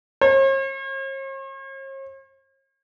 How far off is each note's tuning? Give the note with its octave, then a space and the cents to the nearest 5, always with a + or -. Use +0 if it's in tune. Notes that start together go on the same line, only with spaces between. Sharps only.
C#5 -45